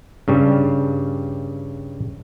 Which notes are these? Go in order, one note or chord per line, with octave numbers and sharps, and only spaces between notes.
G2 C#3 G3